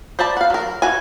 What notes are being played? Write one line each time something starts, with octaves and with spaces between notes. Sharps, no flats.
C5 D5 E5 A5 B5
F5 F#5
F#3 A#4
E3 F#4 A4 G#5